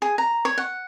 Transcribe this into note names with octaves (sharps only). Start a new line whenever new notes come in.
G#4
A#5
C#5
F#5